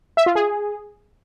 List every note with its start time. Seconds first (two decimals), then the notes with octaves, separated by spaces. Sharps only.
0.17 E5
0.26 F4
0.35 G#4